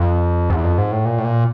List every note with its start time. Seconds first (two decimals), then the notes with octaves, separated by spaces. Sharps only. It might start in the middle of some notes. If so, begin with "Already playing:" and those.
Already playing: F2
0.50 E2
0.64 F2
0.78 G#2
0.92 A2
1.05 A#2
1.19 A2
1.24 A#2